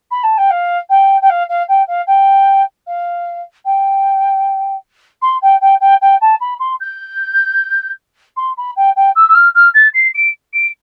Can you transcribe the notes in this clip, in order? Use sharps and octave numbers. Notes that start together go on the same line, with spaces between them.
B5
A5
G5
F5
G5
G5
F5
F5
G5
F5
G5
F5
G5
C6
G5
G5
G5
G5
A5
B5
C6
G6
C6
B5
G5
G5
E6
E6
F6
F6
A6
C7
D7
D7